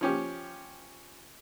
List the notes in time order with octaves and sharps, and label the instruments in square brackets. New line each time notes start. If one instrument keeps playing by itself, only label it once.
[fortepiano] F3 C#4 G4